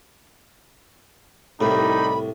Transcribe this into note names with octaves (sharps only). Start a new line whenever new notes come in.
C2 A2 G3 D#4 B5